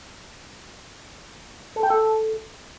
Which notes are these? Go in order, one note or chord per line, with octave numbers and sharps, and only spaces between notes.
A4
G5
A4